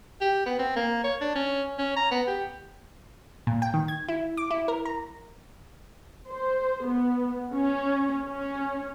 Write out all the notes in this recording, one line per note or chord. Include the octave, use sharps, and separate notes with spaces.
G4
B3
C4
A#3
C#5
D4
C#4
C#4
A#5
B3
G4
A#2
G5
D#3
G#6
E4
D6
E4
A#4
A#5
C5
B3
C#4
C#4